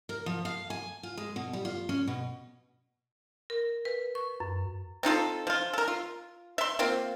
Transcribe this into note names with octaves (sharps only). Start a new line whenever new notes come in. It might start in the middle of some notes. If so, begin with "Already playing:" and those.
A#4
F3
F5
G#5
F4
G#3
B2
G3
F4
C#4
B2
A#4
B4
C#6
F#2
C4 D#4 F4 A4
F3 F4
A4 A#4
F4
E5 C6
A#3 C4 F4